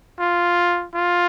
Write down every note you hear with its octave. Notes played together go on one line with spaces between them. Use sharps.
F4
F4